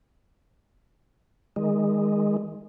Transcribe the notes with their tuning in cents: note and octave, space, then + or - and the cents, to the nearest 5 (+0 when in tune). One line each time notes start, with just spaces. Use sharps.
D#3 +5 G#3 -10